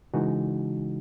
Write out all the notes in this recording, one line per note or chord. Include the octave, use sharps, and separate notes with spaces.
C#3 E3 G#3 D#4 F#4